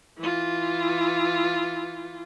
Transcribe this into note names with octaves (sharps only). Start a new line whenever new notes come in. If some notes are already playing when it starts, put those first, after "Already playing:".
E3 F4